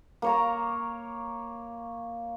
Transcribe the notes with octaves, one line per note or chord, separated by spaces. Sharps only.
A#3 C#5 A#5